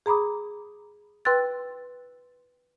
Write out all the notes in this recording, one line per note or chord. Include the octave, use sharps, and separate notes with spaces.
G#4 A#5 B5 D6 D#6
B4 G5 C6 E6 F#6 A6